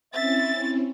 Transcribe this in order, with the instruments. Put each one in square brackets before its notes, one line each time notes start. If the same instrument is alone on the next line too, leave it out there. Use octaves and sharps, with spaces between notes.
[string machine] C4 C#4 E4 [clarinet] E5 [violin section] A6